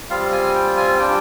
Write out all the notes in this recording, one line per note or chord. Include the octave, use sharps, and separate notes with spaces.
G3 C4 F4 F5
G#5
G5
G#5
G3 D4 F4 G5